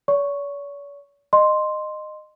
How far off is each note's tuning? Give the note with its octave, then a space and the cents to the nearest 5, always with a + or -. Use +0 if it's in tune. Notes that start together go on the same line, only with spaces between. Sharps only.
C#5 +45 C#6 +0
D#5 -20 C6 +0